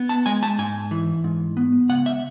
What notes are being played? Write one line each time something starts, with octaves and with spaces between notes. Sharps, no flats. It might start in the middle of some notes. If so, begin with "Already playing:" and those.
Already playing: B3
A5
G#3 G#5
A5
G#2 G#5
E3
G#2
B3
C#2 F#5
E5